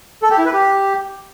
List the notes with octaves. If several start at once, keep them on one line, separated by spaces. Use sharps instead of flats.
A4
G4
E4
B4
G4